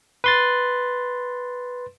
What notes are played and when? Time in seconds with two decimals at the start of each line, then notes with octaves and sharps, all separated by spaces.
0.24 B4 C6 A6